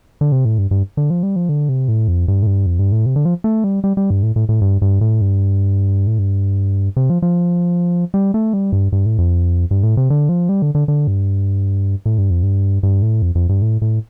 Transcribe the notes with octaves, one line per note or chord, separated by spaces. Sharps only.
D3
C3
A2
G2
G2
D3
F3
G3
F3
D3
C3
A2
F2
G2
A2
G2
F2
G2
A2
C3
D3
F3
A3
G3
G3
G3
G2
A2
A2
A2
G2
G2
A2
G2
A2
G2
C3
F3
F3
G3
A3
G3
G2
G2
A2
F2
G2
A2
C3
D3
F3
G3
D3
D3
D3
G2
A2
G2
F2
G2
G2
A2
F2
F2
G2
A2
A2